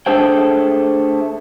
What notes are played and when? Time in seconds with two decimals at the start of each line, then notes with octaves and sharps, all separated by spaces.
0.06 A3 D4 G#4 A4 C5 G5